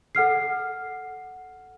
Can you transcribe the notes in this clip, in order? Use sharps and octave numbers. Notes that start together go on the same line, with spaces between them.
A4 F#5 F6 C7